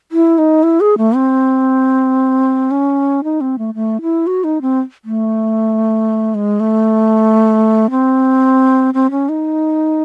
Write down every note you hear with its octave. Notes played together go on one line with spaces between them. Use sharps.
E4
D#4
E4
G#4
A3
C4
C#4
D#4
C4
A3
A3
E4
F#4
D#4
C4
A3
G#3
A3
C4
C4
C#4
D#4